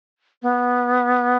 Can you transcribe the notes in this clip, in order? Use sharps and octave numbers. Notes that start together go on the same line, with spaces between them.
B3